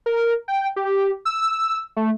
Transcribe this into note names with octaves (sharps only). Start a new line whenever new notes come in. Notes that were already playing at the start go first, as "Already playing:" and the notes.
A#4
G5
G4
E6
A3